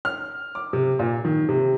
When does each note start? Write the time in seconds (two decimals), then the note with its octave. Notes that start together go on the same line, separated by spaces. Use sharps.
0.05 F6
0.55 D6
0.73 C3
0.99 A#2
1.25 D#3
1.49 C3